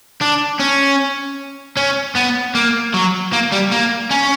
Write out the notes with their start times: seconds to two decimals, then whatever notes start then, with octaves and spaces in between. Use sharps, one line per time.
0.21 D4
0.60 C#4
1.77 C#4
2.16 B3
2.55 A#3
2.94 F#3
3.33 A#3
3.52 G3
3.72 A#3
4.11 C#4